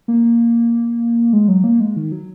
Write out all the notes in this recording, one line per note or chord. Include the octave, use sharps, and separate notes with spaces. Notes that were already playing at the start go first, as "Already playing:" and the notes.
A#3
G#3
F#3
A#3
G#3
D#3
F#3